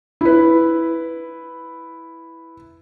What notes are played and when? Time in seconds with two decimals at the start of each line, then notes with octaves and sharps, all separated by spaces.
0.21 E4 B4